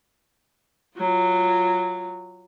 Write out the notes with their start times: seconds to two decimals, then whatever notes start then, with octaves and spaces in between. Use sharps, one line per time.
0.97 F#3 F4